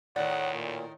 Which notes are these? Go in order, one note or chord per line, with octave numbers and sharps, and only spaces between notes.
D2 A2 D#3 D5 F#5
A#2